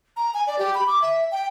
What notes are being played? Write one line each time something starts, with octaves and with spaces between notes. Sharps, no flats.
A#5
G#5
D5
G4
B5
D6
E5
G5